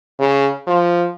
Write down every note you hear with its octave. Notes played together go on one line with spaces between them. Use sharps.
C#3
F3